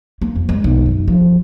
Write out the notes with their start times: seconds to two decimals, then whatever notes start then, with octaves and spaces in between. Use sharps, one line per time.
0.22 A#3
0.36 F2
0.49 G#3
0.64 B1
0.86 F#2
1.08 F3